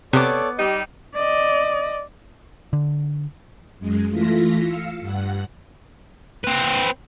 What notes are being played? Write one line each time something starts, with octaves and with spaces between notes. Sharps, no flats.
C3 B3 A4 C#5 D5 D6
G3 D#4 G4 D#5
D5 D#5
D3
F#2 G#3
E3 A3 F4 A#6 B6
F5 E6 C#7
G2 F#5
C4 B4